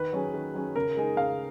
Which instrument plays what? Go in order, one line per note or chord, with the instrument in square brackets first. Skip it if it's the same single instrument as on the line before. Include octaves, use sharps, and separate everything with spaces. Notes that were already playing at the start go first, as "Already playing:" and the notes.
Already playing: [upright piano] D#3 [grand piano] B4
[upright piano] F#3 C#4 G#4
D#3
F#3 C#4 G#4
[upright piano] C#3 [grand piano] A#4
[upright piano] G#3 D#4 G#4
[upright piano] C#3 [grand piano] F5